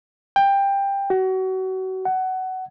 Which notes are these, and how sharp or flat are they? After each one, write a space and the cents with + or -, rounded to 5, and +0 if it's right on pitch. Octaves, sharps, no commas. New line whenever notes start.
G5 +15
F#4 +30
F#5 +20